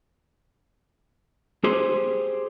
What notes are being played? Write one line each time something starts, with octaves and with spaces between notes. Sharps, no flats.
G4 G#4 C5